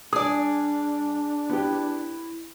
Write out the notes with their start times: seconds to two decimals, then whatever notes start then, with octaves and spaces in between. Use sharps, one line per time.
0.13 G3 D4 G#4 D5 D#6
1.50 B3 E4 G4